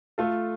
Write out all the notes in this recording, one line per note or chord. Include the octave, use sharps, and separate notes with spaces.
A3 F4 A4